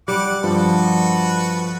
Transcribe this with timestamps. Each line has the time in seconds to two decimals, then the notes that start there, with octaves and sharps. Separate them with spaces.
0.08 G3 F#5 D6
0.44 G2 F3 F#4 A4 B4